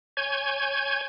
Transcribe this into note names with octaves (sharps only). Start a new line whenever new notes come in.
C#5 G#5 G6 G#6